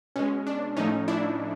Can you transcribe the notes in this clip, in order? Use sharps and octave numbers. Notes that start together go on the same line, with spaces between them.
B2 G#3 C#4
D4
A2 F3 A3 C#4 D#4
D4 E4